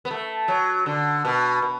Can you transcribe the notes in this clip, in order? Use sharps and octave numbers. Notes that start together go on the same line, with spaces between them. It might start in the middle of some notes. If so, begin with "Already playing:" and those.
B3
A3
F#3
D3
B2
B2